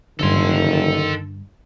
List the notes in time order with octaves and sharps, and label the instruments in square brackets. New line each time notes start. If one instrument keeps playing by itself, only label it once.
[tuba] F#1 [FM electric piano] G2 D3 [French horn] D#3 [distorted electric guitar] A4 C6